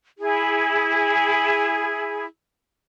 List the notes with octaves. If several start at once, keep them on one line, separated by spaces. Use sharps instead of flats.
E4 G#4